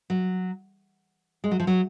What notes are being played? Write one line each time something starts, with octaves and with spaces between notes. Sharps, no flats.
F#3
G#3
F#3
F3
F#3